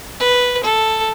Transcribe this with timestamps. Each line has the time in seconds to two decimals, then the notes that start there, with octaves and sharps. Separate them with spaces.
0.20 B4
0.64 A4